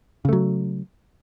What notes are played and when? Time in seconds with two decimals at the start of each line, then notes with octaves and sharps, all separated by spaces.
0.25 C#3
0.29 A3
0.33 F#3